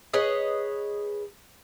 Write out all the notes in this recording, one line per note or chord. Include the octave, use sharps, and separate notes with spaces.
G#4 B4 C#5 D#5